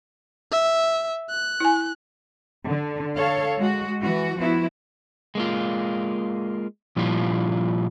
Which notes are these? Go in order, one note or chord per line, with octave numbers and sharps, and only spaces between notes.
E5
F#6
E4 G#5
D3
A4 C#5 F5
G#3 F#4
E3 F#4
F3 B3 E4 F#4
G#3 A#3 F4
A#2 F3 G3 E4 F4